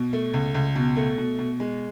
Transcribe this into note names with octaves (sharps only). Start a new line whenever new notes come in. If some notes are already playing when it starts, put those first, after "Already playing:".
Already playing: B2
A3
C#2
C#2
B2
A3
B2
B2
G#3